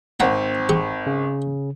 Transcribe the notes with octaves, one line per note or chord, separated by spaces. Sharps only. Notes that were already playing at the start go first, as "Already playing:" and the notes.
G#1 C4 F#5 G5 A#5
G4 G#4 C#6
C#3